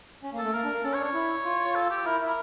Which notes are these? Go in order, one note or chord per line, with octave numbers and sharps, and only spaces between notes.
C#4
A#3
A4
A3
A#3 A#4
D4
A#3
C#4 A4
C#5
D4
C#5
E4
F4
A4
G4
E4 A#4
E4 A#4